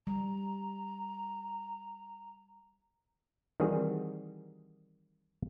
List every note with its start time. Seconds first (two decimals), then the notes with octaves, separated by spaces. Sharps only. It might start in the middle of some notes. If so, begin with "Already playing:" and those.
0.07 G3 A#5
3.60 D#3 E3 G3 C4 F#4 G#4